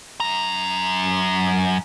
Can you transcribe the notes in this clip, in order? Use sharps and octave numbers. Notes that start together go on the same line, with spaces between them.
F#2 A#5